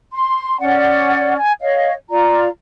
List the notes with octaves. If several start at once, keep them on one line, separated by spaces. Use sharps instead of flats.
C6
C#4 D5 F#5
G#5
C#5 D#5 F5
F4 D5 A#5